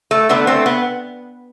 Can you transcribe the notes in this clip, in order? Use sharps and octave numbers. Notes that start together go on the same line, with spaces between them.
A3
D3 A3 B3
A3 C4
B3